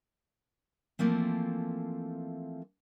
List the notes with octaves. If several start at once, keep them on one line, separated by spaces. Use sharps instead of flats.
E3 F3 A3 A#3 C4